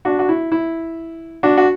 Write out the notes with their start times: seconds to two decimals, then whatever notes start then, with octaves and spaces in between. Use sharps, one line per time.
0.05 D4 F#4
0.19 F#4
0.29 E4
0.52 E4
1.43 D4 F#4
1.58 F#4